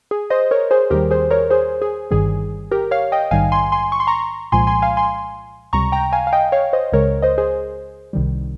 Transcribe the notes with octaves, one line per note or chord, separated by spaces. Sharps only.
G#4
C5 D#5
A#4 C#5
G#4 C5
D#2 D#3 G3 G4 A#4
G#4 C5
A#4 C#5
G#4 C5
G#4
G1 G2 D#3 G3 G#4
G4 A#4
C#5 F5
D#5 G5
A#1 G#2 D#3 G3 F5 G#5
G#5 C6
G#5 C6
C#6
C6
A#5 C#6
C2 A#2 F3 G#3 G#5 C6
G#5 C6
F5 G#5
G#5 C6
C#2 C3 G3 A#5 C#6
G5 A#5
F5 G#5
F5
D#5 G5
C#5 F5
C5 D#5
C#2 C#3 G#3 A#4 C#5
C5 D#5
G#4 C5
C2 C3 D#3 G3